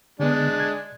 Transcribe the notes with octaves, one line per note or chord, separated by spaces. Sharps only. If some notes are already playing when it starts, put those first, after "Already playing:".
D3 G#3 B3 D4
G#6